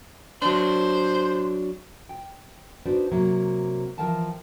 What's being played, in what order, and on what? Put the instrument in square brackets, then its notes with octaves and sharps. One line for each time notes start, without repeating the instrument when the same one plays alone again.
[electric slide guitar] F#3 D4 [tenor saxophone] C5
[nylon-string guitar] G5
D4 D#4 F#4 B4 C5 D5
C3 F#3 A#3
E3 F3 A#4 F5 G5 A5